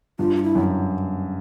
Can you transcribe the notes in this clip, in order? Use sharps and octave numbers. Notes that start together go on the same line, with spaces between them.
G2 F4
F4
E4
F#2